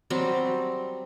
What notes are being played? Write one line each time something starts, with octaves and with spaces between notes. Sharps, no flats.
F#3 G3 C4 G4